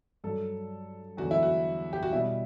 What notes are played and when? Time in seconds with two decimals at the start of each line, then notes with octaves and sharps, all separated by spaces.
0.24 G2 F#3 A4
1.17 E2 D3 F#3 F#4
1.31 E4
1.43 F#4
1.93 G4
2.03 F#4
2.12 B2 E4
2.16 G3